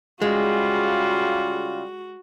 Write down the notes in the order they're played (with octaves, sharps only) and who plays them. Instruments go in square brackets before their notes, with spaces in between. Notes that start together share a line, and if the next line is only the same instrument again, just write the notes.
[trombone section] C#3 G3 F4 [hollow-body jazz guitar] G#3 [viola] F#4